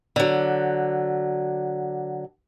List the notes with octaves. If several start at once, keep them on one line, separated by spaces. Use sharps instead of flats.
D3 F#3